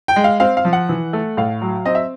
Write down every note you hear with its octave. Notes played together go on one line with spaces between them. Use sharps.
G5
G#3
F5
C4 F5
F5
F3
F#5
E3
A3
A2 F5
F#3
C4 D#5
E5